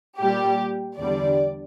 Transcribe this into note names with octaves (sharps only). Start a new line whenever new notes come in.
A#2 G3 G4
E2 D3 G3 D5